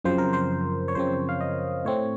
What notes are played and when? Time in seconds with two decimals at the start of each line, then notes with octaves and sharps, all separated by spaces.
0.04 F#2 C#3 F3 C4 C5
0.18 A#4
0.33 C5
0.88 C#5
0.95 F#2 C#3 F3 C4 C5
1.29 F5
1.41 D#5
1.85 A2 A3 C4 C#5